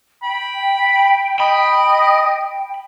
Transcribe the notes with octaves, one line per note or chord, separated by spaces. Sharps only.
G5 B5
D#5 B5